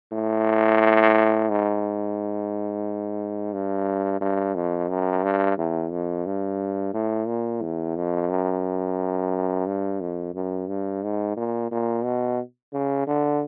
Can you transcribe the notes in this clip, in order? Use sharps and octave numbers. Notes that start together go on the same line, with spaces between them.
A2
G#2
G2
G2
F2
F#2
G2
E2
F2
G2
A2
A#2
E2
F2
F#2
G2
F2
F#2
G2
G#2
A#2
A#2
B2
C#3
D3